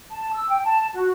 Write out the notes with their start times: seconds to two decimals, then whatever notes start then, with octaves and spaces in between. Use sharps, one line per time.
0.11 A5
0.33 E6
0.50 G5
0.63 A5
0.94 F#4